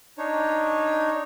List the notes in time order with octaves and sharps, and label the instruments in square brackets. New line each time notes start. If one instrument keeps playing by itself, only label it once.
[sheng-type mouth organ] D4 D#4 C#5